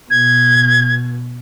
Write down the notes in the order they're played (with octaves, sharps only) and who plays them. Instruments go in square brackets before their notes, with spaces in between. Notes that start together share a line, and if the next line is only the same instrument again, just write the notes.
[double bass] B2 [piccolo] G#6